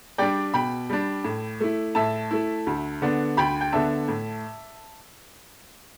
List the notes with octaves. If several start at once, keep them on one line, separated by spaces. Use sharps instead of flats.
G3 D4 D5 G5
B2 G5 B5
G3 D4
A2
A3 E4
A2 E5 A5
A3 E4
D2
D3 B3 D4
D2 G5 B5
G5
D3 B3 D4 E5 A5
A2